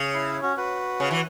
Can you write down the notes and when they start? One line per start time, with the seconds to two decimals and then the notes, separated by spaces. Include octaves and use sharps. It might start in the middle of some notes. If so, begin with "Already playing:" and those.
Already playing: C#3
0.14 E4
0.42 C#4 F#4
0.57 F#4 B4
1.00 C#3
1.11 E3